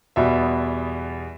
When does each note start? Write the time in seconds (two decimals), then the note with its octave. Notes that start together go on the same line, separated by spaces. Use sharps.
0.16 E2 B2 G3 B3 E5